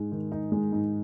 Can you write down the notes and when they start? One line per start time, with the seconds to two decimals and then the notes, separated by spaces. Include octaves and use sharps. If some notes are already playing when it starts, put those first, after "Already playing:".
Already playing: G#2 G#3
0.12 D#3
0.32 D#4
0.52 G#3
0.72 G#2